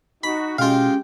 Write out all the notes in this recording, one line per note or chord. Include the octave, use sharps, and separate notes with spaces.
D#4 F#4 B5
B2 G#3 C#4 F4 G4 F5 G5